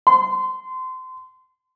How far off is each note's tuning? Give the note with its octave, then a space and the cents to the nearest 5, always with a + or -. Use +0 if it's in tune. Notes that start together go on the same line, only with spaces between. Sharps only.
C6 -25